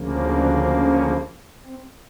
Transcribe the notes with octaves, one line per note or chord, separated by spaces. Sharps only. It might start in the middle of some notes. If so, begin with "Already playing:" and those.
Already playing: D2 C#3 F3 A#3
D4
C#4
C4